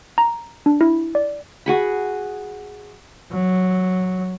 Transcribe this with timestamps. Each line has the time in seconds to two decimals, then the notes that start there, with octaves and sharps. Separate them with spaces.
0.18 A#5
0.66 D4
0.81 E4
1.15 D5
1.66 F#4 G#4 B5
3.32 F#3